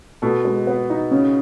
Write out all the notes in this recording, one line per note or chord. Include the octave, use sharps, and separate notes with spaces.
B2 A4
G#3
B3
D#4
C#3 C#4